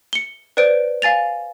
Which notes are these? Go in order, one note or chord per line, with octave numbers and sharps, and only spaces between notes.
C#7 G7
B4 C5 D5 D7
F5 G#5 A6 F7